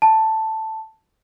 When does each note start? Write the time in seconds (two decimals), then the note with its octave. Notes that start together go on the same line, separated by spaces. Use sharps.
0.02 A5